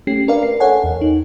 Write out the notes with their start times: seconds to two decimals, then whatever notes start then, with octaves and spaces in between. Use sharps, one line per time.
0.07 A3 C#4 G4 C7
0.28 D4 A#4 B4 D5 F5
0.43 C7
0.60 A4 A#4 C#5 F#5 G#5
0.84 E2
1.01 D#4